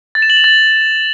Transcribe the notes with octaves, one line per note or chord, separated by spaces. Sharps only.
A6
E7
F#7
F7
A6